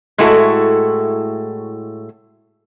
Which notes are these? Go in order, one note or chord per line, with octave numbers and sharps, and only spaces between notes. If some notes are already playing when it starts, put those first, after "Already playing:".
A2 G#3 A3 E4 F#4 A4